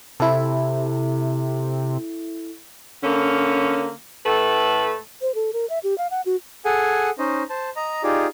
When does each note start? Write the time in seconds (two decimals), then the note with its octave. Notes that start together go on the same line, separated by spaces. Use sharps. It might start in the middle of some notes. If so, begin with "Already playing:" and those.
0.20 C3 E4 A4
3.04 D3 A#3 C#4
4.26 A2 A3 A4 B4
5.21 C5
5.35 A4
5.53 A#4
5.70 E5
5.84 G4
5.98 F5
6.11 F#5
6.26 F#4
6.65 G#4 A4 F#5 G#5
7.19 C#4 D#4 C5 D#5
7.50 C5 A5
7.76 D#5 A#5
8.03 D#4 F4 G4 G#4 D5